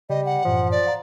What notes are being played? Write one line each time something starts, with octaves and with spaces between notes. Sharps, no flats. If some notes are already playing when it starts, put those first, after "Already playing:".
C#3 G3 D#5
F#5
F#2 A2 E3 F3
D5
F5 A#5